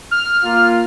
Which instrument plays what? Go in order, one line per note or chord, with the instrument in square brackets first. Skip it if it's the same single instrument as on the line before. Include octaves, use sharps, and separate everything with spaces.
[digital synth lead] F6
[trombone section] A#3 F4